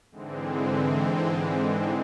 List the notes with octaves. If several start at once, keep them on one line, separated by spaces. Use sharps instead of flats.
G#2 D3 E3 G#3 C4